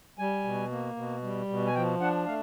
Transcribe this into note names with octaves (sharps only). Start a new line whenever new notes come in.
G3 G#5
B2
A#3
B2
G3
B2
G#5
F3 G5
D4 F#5
A3 F5